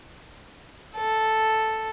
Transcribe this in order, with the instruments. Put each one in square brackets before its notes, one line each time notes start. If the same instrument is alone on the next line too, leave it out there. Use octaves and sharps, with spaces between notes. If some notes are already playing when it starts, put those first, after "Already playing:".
[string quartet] A4